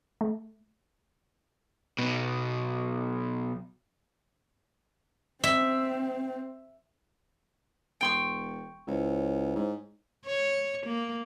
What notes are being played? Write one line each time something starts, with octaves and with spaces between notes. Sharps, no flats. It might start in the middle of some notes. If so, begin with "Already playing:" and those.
A3
B1 B2
C4 E5
E1 G5 C6 C#6
C#2 E4 C5 C#5
G#2
C#5
A#3